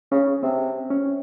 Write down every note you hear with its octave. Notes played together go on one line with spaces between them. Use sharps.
C#3 C#4
C3 C4
C#4